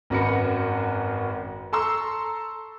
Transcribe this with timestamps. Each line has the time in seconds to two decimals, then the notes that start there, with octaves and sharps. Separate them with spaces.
0.10 G#1 F#2 F#4 B4 A#6 C#7
1.73 A4 A5 A#5 C6 C#6 E6